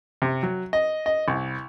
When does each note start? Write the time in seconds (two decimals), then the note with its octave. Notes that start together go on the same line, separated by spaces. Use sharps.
0.22 C3
0.43 F#3
0.73 D#5
1.06 D#5
1.28 C2